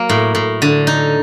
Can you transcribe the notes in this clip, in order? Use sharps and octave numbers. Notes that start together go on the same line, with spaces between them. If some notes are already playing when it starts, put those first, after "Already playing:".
Already playing: F#3 A#3
A2
A2
D3
D#4